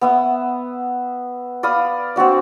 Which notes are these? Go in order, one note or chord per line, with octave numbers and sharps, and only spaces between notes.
B3 E5 D#6
D5 F5 B5 D#6
C4 D4 F#4 D5